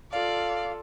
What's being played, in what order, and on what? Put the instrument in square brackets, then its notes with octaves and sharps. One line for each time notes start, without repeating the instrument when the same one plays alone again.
[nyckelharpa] F4 A4 [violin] D5 [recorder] F5